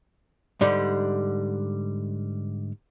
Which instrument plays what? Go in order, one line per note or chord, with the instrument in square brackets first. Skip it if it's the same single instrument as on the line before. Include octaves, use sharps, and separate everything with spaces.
[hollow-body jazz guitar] G#2 D3 G3